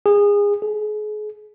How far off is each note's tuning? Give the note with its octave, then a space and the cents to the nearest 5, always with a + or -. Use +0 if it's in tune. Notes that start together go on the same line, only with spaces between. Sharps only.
G#4 -25
G#4 +35